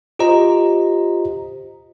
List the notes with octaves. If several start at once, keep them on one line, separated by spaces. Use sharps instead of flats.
F4 G4 C5 D#5 A#5